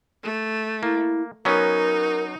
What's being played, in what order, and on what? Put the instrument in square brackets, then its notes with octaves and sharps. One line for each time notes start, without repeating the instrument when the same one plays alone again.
[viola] A3
[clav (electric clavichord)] A#3 [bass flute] E4
[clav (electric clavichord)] F#3 B3 C#4 [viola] D#4 [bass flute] A#4